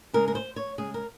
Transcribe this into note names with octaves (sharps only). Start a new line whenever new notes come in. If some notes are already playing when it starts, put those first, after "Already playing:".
C#3 G#3 A#4
A#4
C5
C#5
C#3 G#3 G#4
A#4